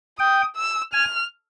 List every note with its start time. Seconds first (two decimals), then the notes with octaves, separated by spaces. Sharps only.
0.19 G5 D#6
0.56 E6
0.93 G#5 F6